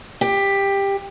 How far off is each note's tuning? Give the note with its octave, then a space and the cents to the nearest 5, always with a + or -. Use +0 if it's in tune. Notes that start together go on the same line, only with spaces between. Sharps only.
G4 +15